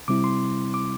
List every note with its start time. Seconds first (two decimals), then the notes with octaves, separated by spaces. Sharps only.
0.08 C3 G3 C4 E4 D6
0.24 C6
0.74 D6